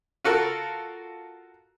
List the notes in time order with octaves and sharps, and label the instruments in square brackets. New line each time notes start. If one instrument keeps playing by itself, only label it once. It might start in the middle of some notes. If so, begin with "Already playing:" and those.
[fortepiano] F4 F#4 A4 A#4